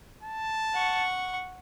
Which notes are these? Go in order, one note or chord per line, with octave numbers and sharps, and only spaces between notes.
A5
F#5 C#6